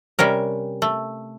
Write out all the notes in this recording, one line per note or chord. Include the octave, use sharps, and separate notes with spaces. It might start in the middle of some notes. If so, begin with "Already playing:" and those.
C3 G3 C#4 A#4
A3